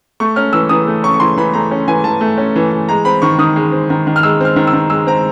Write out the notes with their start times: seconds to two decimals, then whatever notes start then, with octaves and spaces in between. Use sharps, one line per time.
0.20 A3 C#6
0.36 C#4 F6
0.53 E3 E6
0.69 E3 D#6
0.87 A3
1.03 C#4 C#6
1.14 C#6
1.20 E3 C6
1.37 E3 B5
1.54 A3 A#5
1.71 C#4
1.88 E3 G#5
2.04 E3 A5
2.21 A3
2.38 C#4
2.56 E3
2.72 E3
2.89 G#3 A#5
3.05 C4 B5
3.22 D#3 C#6
3.39 D#3 D#6
3.56 G#3
3.72 C4
3.90 D#3
4.07 D#3
4.16 F6
4.23 G#3 E6
4.40 C4 F6
4.56 D#3
4.67 E6
4.73 D#3
4.90 G#3 E6
5.07 C4 A#5